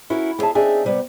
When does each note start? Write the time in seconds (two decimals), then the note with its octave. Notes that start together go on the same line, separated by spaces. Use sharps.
0.10 C#4 E4 F#4 A#4
0.39 B3 G#4 C#5 E5 A5
0.55 C4 D4 D#4 G#4 D5 E5
0.84 C3 G3 B3